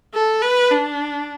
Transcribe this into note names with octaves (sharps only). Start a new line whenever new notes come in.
A4
B4
D4